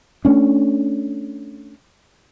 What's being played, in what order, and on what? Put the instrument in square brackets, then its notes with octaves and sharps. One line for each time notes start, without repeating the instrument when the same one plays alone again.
[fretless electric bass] A3 C#4 D4